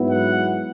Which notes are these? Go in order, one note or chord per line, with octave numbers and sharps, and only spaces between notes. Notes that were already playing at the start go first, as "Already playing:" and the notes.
Already playing: G#2 F#3 B3 E4
F#5